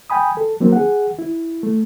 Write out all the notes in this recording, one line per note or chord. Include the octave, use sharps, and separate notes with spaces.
G5 G#5 B5 D#6
A4
F#3 A#3 C4 D#4 A#4
G#4 F#5
E4
A3